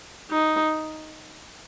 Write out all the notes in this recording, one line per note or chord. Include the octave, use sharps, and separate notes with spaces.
D#4